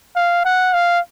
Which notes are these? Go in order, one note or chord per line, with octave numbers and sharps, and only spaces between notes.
F5
F#5
F5